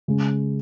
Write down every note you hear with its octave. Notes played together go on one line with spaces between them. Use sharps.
C#3 G#3